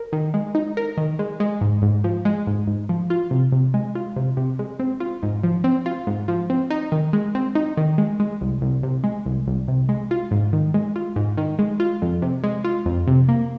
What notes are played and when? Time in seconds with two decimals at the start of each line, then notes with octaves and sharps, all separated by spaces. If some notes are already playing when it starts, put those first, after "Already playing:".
Already playing: A#4
0.13 D#3
0.34 G#3
0.55 D#4
0.77 A#4
0.97 D#3
1.19 G#3
1.40 G#3
1.61 G#2
1.82 G#2
2.04 F3
2.25 G#3
2.47 G#2
2.67 G#2
2.89 F3
3.10 F4
3.31 C3
3.52 C3
3.74 G#3
3.95 F4
4.16 C3
4.37 C3
4.59 G#3
4.79 C4
5.00 F4
5.23 G#2
5.43 F3
5.64 C4
5.86 F4
6.07 G#2
6.28 F3
6.50 C4
6.70 D#4
6.92 D#3
7.13 G#3
7.35 C4
7.55 D#4
7.77 D#3
7.98 G#3
8.20 G#3
8.41 C2
8.62 C2
8.83 C3
9.04 G#3
9.26 C2
9.47 C2
9.68 C3
9.89 G#3
10.11 F4
10.31 G#2
10.53 D#3
10.74 G#3
10.96 F4
11.16 G#2
11.38 D#3
11.59 G#3
11.80 F4
12.02 F2
12.22 C3
12.43 G#3
12.64 F4
12.86 F2
13.07 C3
13.29 A#3